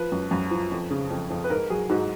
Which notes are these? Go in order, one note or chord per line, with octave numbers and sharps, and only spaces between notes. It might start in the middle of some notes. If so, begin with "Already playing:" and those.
Already playing: F3 B4
F#2
F#2
F3
F2
C#3
F2
F2
B4
G#2 A#4
F#3 G#4
G#2 F#4